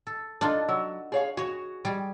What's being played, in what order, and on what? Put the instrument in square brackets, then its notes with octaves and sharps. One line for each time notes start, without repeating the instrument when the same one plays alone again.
[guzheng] A4
[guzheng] D4 D#4 F4 [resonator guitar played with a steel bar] A4
[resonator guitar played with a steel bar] F#3
G#4 C#5 F5
[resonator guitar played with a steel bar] F#4 [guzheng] G#4 C#5
[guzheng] G3 G#4